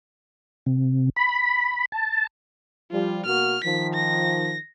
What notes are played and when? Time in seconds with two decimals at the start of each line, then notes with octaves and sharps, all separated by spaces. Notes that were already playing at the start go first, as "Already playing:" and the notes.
0.66 C3
1.16 B5
1.92 A5
2.92 F3 G3 F4
3.26 B2 A#3 F#4 F6
3.64 D#3 F3 B6
3.95 A#6